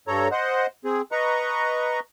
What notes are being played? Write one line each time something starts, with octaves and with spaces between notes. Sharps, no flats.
G2 A4 C#5 A#5
C5 D#5 F#5
C4 G#4
B4 D#5 A#5 C#6